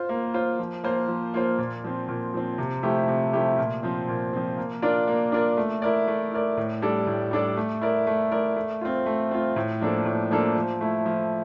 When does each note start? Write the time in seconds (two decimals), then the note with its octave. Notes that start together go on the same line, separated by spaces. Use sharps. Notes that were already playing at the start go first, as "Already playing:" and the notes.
Already playing: F4 C5
0.09 A#3
0.34 F4 C5
0.59 F3
0.84 A#3 F4 C5
1.08 F3
1.34 A#3 F4 C5
1.58 A#2
1.84 F3 C4
2.08 A#2
2.34 F3 C4
2.58 C3
2.83 F3 A3 E4 G4
3.08 C3
3.33 F3 A3 E4 G4
3.58 A#2
3.83 F3 C4
4.08 A#2
4.33 F3 C4
4.57 A#3
4.82 D4 F4 A#4 D5
5.08 A#3
5.32 D4 F4 A#4 D5
5.57 A3
5.82 E4 A#4 D5
6.08 A3
6.32 E4 A#4 D5
6.57 A2
6.82 G3 D4 A4 D5
7.07 A2
7.31 G3 D4 A4 D5
7.57 A3
7.81 E4 A#4 D5
8.07 A3
8.31 E4 A#4 D5
8.56 A3
8.81 C4 F4
9.06 A3
9.31 C4 F4
9.56 A2
9.81 F3 A#3 D4 A4
10.05 A2
10.31 F3 A#3 D4 A4
10.55 F3
10.81 A3 E4
11.06 F3